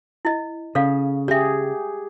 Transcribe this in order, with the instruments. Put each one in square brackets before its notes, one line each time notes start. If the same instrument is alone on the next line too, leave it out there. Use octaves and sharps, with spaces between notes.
[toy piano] E4 D#5
[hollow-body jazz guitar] C#3 [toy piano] A4 D5 F5
[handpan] G4 G#4 [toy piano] D5 E5